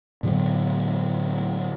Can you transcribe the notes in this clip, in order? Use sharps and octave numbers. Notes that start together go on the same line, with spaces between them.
A2 D3 F#3 B3